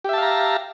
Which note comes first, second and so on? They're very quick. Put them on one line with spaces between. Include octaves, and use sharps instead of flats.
G4 E5 A5 F5 A#5